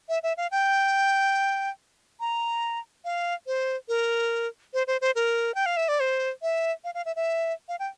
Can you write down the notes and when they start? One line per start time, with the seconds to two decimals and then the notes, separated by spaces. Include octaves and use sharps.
0.09 E5
0.23 E5
0.37 F5
0.51 G5
2.20 A#5
3.05 F5
3.47 C5
3.88 A#4
4.74 C5
4.87 C5
5.01 C5
5.15 A#4
5.55 G5
5.66 F5
5.77 E5
5.88 D5
6.00 C5
6.42 E5
6.84 F5
6.95 F5
7.05 E5
7.16 E5
7.69 F5
7.79 G5